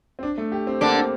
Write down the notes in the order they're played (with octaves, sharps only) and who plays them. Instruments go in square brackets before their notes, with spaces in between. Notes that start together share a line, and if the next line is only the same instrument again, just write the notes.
[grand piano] C4
D4
A3
G4
C4
[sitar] D3 D4 [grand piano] A#3
[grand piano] C4